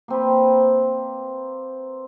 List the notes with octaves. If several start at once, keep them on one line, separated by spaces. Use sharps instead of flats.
A#3 C4 B4